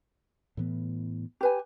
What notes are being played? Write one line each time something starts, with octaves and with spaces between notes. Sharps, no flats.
A2 E3 B3
G4 B4 G#5